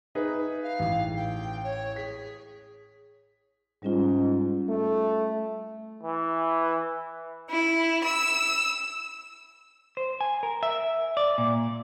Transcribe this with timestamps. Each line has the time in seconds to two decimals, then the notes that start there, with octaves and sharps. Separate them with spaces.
0.15 D#4 G#4 B4 E5
0.62 F5
0.79 A1
1.16 G5
1.63 C#5
1.96 G#4 B6
3.83 G#2 G3 C#4 F4
4.69 A3
6.03 E3
7.50 E4
8.04 E6
9.97 C5
10.21 G#5
10.43 A#4
10.63 E5
11.17 D5
11.38 A#2